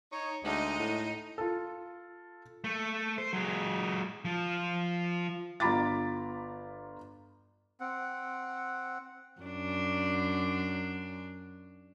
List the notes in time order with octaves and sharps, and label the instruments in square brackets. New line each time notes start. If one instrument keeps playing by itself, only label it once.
[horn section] D#4 C#5
[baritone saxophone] D2 [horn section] G#3 [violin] D#4 D#5
[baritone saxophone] A2
[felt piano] F4 A4
[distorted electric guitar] A3
C5
F#3 G#3
F3
[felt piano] G1 F4 A#5 B5 D6 A6
[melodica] C4 F#5
[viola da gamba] F#2 D4